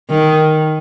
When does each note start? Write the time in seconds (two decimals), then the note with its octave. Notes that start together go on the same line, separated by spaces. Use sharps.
0.10 D#3